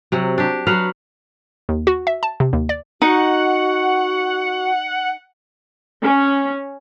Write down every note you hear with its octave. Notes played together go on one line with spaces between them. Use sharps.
C3 F#3
D4 G4
F#3 B4 F5
D#2
F#4
E5
A5
C3
D#2
D5
D#4 F#4 F#5
C#4